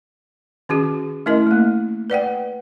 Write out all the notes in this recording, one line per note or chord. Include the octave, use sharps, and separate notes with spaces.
D#3 C#4 F#4 G#4
A3 C#4 E4 A#4 D#5
A3 A#3
B4 D5 F#5 G5